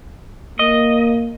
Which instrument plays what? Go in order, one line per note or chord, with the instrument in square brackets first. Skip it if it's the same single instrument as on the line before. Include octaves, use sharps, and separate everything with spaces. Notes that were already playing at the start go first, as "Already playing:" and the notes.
[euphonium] A#3 [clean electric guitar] D#5